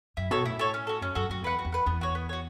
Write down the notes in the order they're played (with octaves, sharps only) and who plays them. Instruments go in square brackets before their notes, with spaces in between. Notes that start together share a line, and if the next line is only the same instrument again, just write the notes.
[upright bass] F#2 [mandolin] E4
[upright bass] B2 [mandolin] A4 C#5
[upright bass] A2 [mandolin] E4
[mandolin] A4 C#5
C#4
F#4 A4
[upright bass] F#2 [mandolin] C#4
[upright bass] F#2 [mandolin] F#4 A4
[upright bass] F#2 [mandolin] F#4
[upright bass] E2 [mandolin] B4 F#5
[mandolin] F#4
[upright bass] E2
[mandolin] B4 F#5
[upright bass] E2 [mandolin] B3
[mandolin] F#4 C#5
B3
F#4 C#5